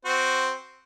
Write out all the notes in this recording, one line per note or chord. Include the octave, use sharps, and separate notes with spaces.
C4 F#4 C5